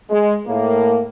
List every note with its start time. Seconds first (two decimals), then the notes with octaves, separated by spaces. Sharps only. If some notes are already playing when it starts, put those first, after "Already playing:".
0.10 G#3
0.46 A2 A#3